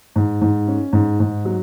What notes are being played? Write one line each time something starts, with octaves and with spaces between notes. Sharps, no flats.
G#2
G#2
C#4
G#2
G#2
F#3